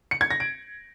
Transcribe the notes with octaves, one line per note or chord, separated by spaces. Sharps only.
C#7
G#6
A#6
D7